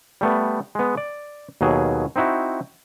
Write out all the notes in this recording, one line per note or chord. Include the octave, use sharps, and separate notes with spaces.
G3 A3 B3
G#3 B3
D5
D#2 B2 F#3 G#4
C4 D#4 E4 F#4